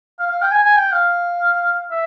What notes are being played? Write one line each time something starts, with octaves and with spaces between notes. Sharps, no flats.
F5
F5
G5
G#5
G#5
G5
F5
E5